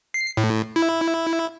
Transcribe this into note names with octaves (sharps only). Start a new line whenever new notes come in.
C7
A2
E4